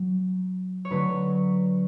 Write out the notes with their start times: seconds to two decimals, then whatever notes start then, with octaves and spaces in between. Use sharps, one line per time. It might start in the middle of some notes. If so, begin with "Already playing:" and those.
Already playing: F#3
0.85 C#5
0.90 D3 F#3 A3 B4